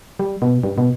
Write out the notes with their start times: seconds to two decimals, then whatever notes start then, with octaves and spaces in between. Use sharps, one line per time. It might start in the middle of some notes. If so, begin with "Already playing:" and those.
0.19 G3
0.42 B2
0.63 G2
0.78 B2